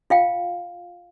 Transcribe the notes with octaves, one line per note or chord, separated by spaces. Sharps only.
F4 F5 G5